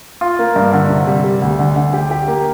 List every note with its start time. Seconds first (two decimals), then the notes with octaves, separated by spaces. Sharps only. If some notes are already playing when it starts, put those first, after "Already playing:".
0.21 F4
0.39 A#3
0.56 G2
0.73 D3
0.90 C3
1.07 G3
1.24 G3
1.42 D2
1.59 D3
1.76 D3
1.93 G4
2.11 G4
2.28 A#3